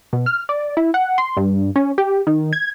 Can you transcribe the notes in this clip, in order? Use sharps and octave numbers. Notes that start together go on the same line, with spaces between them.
B2
F6
D5
E4
F#5
C6
G2
C#4
G4
D#3
G#6